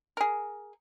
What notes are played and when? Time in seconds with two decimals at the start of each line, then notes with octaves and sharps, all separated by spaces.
0.17 G#4 A#4